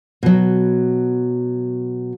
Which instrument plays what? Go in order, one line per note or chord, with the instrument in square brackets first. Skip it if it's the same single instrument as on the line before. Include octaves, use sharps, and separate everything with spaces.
[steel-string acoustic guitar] B2 F#3